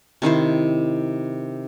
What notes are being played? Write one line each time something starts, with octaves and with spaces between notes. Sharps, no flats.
C3 D#3 E4 C5